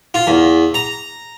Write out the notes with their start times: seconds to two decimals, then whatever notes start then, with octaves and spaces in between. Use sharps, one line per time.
0.14 F4
0.27 E2
0.74 A#5